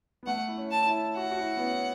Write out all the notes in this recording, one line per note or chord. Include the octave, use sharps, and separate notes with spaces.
B3
A3 F#5
E4
C#4
A5
E4
F#4 F#5
F#4
E4
B3
C#4